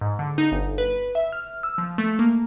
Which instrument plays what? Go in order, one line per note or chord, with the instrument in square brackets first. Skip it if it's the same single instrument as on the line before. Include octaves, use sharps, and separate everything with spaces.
[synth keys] G#2
D3
D#4
G1
B4
E5
F6
E6
F3
A3
A#3